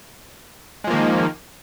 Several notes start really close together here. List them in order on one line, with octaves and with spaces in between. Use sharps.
G#3 F3 A#3 D#3